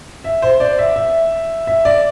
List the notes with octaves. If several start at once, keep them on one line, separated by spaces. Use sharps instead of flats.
E5
C5
D5
E5
E5
E5
D5